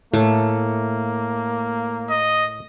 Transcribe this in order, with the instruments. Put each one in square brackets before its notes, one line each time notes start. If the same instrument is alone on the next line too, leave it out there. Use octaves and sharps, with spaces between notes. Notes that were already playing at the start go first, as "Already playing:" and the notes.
[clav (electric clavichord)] A2 [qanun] A3 [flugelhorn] A#3
[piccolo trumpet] D#5